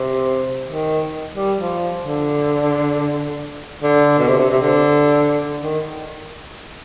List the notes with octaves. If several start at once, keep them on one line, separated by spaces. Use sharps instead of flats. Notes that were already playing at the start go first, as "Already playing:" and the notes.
Already playing: C3
D#3
G3
F3
D3
D3
B2
C3
C3
C3
D3
D#3